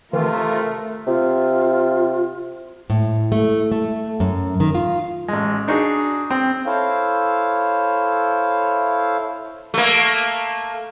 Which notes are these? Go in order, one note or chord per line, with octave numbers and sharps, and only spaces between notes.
C3 D#3 E3 A3 F4 A#4
C3 F4
A2
A3
A3
F#2
D#3
F4
A1 G#3
D4 D#4 F#4 G#4
C4
E4 A4 C5 C#5 F5
A3 A#3